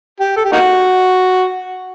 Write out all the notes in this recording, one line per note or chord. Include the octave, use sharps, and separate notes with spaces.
G4
A4
G4
A#3 D#4 F#4